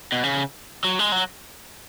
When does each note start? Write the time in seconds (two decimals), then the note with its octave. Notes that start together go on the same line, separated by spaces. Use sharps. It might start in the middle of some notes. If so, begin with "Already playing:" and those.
0.12 B2
0.23 C#3
0.84 F#3
0.99 G#3
1.12 F#3